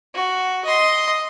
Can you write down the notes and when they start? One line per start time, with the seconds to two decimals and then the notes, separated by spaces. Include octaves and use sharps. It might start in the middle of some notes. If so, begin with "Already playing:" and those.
0.14 F#4
0.64 D#5 C6